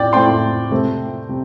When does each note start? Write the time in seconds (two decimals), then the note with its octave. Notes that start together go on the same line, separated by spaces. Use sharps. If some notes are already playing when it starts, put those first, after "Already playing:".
Already playing: A2 C4 D5 G5
0.13 A2 A3 C4 G5 C6
0.71 C3 A3 C4
1.29 C3